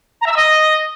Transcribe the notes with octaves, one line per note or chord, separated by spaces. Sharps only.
A#5
E5
E6
D#5